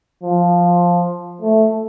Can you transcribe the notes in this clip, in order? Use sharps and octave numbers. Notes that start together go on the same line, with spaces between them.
F3
A3